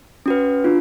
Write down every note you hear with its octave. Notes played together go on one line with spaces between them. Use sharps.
C#4 F#4 B4
D4 F4